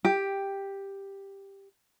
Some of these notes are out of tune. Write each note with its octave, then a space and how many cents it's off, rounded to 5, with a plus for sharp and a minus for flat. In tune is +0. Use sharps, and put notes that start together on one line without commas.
G4 +5